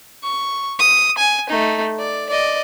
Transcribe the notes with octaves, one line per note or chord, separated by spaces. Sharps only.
C#6
D#6
G#5
A3 D#4
D5
D5 D#5